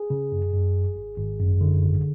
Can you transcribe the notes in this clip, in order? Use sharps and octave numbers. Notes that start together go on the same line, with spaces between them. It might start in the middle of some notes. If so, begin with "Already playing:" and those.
Already playing: G#4
C#3
F#2
F#2
G#1
G#1
G#1
F#2
D3
G#1